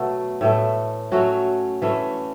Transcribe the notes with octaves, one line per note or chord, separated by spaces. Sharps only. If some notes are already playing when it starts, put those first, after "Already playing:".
Already playing: B2 F#3 A3
A2 E3 A3
F#3 A3 C#4 F#4
E3 A3 C#4